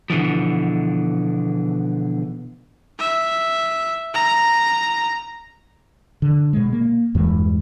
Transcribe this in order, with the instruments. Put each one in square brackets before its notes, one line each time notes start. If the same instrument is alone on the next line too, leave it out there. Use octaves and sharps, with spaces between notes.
[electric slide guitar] B2 D3 E3 F3
[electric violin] E5
A#5
[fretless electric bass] D3
B2 G#3
A#3
E2 G2 E3 G#3